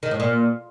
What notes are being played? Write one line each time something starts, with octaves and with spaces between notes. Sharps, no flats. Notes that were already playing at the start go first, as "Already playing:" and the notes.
D#3
A2
A#2